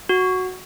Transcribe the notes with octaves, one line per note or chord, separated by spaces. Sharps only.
F#4